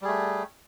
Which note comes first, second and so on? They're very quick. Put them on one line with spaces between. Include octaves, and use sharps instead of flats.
G3 G#4 A3